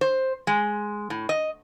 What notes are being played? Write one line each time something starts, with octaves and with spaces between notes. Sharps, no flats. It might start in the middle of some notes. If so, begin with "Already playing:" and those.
C5
G#3
A2
D#5